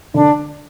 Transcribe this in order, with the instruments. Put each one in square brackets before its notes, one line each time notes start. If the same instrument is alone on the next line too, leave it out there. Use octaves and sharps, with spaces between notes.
[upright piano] D3 [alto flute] D4